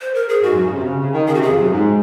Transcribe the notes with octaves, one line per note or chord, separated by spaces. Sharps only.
C5
A#4
G#4
G#2 F#4
F#2
C#3
C3
C#3
C#3
D#3
C#3 G#4
F#4
C3 G#4
F2
F#2
G#2